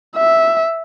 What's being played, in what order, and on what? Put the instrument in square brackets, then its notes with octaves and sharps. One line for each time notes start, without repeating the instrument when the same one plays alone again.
[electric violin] E5